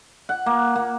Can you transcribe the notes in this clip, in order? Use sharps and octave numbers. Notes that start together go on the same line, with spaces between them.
F#5
A#3
A#3